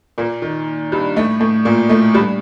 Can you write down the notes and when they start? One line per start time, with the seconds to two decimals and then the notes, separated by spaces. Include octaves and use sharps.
0.18 A#2 A#3
0.42 D#3
0.92 G2 G3
1.16 A2 A3
1.40 A2 A3
1.65 A#2 A#3
1.89 A2 A3
2.14 G2 G3